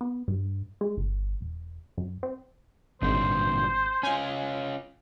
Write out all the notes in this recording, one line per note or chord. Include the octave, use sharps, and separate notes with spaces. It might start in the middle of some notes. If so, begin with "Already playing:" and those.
B3
G2
G#3
G1
E1
F#2
C4
G#1 G2 A#2 D3 C5
C#4 F4 G#5